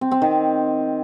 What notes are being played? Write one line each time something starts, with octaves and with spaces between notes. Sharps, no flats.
C4
C4
D#3